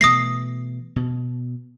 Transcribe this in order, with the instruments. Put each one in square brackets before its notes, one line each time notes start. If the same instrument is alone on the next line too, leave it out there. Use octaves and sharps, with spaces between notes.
[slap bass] B2 E3 A3 [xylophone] D#6 A#6 C7
[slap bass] B2